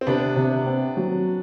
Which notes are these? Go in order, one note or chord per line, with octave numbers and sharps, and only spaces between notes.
C4
C3 B3 D4
C3
C4
F#3